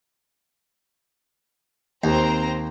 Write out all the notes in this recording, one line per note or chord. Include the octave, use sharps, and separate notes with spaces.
D#2 C4 C5 A#5